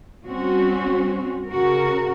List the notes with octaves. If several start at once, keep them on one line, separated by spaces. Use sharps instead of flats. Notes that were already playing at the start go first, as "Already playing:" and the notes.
G3 C4 C#4 F#4
C#3 F#4 A#4